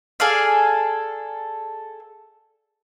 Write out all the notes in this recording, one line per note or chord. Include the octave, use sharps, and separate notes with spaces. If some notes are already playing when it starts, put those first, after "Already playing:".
G#4 A4 D5 F5